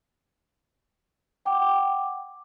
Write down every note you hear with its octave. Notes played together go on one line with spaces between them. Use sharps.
F#5 G5 D6